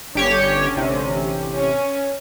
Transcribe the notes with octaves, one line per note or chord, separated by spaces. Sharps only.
G1 D3 C#4 G4 C#5
A1 C3
C#4